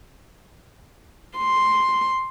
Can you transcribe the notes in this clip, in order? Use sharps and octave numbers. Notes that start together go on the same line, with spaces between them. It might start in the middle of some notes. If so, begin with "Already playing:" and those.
C6